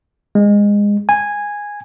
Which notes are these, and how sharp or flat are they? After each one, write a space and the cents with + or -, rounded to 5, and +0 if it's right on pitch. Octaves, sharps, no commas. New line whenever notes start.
G#3 -20
G#5 -10